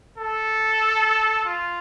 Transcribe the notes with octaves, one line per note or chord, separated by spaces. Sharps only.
A4
F4